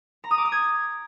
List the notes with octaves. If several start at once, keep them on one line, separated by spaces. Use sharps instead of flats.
A#5
D#6
D6
D#6
G#6